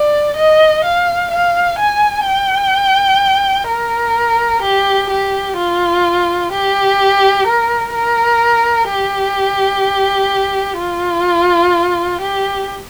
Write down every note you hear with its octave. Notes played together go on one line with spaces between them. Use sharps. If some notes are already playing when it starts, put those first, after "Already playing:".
Already playing: D5
D#5
F5
F5
G#5
G5
A#4
G4
G4
F4
G4
A#4
A#4
G4
F4
G4